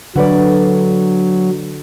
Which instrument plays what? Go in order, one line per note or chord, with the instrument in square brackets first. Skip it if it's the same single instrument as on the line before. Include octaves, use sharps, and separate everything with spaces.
[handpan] D3 [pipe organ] F#3 [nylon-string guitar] F#4 B4 D5